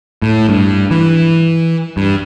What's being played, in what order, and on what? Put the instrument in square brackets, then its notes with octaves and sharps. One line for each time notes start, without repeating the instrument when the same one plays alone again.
[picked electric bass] A2
G2
E3
G2